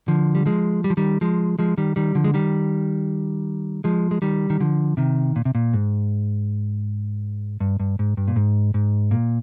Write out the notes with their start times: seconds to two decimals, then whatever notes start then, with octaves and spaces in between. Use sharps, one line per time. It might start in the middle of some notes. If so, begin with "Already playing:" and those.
0.08 D3 F3
0.35 G3
0.46 F3 G#3
0.84 G3
0.90 F3
0.97 D#3 G3
1.21 F3 G#3
1.59 F3 G#3
1.78 D#3 G3
1.96 D#3 G3
2.15 D3 F3
2.24 G#3
2.34 D#3 G3
3.84 F3 G#3
4.11 G#3
4.22 D#3 G3
4.50 D#3
4.60 D3 F3
4.97 C3 D#3
5.36 A#2
5.45 C3
5.55 A#2
5.73 G#2
7.60 G2
7.80 G2
7.99 G#2
8.17 G2
8.28 A#2
8.36 G#2
8.74 G#2
9.11 A#2